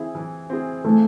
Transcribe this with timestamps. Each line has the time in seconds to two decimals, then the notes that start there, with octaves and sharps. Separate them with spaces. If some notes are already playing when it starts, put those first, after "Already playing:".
Already playing: E3 C4 E4 G#4
0.15 E3
0.50 C4 E4 G#4
0.84 E3 A3